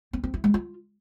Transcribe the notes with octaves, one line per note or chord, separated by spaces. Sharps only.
C4
C4
E4
G#3
F4